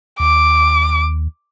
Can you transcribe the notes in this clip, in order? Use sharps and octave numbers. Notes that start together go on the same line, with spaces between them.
D#2 D6